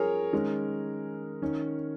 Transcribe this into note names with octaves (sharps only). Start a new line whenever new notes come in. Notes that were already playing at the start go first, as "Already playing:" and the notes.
Already playing: F3 C#4 G#4 A#4 C#5
D#3 G#3 C#4
D#3 C#4